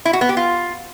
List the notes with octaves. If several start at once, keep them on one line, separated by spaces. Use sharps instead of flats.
E4
F#4
B3
G4
F4